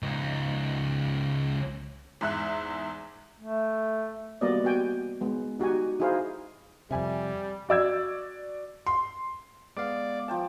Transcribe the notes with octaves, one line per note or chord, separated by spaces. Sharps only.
C#2 D#4
E2 G#2 E5 F#6
A3
G3 A#3 B3 F#4 D5 D#5
B3 F#4 G4 G5 G#5
G#3 B3
D#4 F#4 G4 G#5
D#4 E4 F#4 G#4 C5 F5
F2 C3 G3 E5 G#5
F#4 D5 E6 G#6
C6
G#3 B3 D5 F5
F3 G5 A5